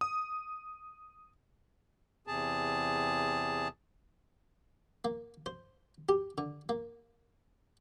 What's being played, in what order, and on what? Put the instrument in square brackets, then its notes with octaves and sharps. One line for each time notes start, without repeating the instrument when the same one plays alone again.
[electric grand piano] D#6
[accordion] E2 C3 G#4 A5
[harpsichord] A#3
C5
G4
D3
A#3